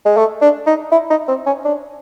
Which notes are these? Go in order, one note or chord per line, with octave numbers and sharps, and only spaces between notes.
G#3
A3
D4
D#4
E4
D#4
C4
C#4
D4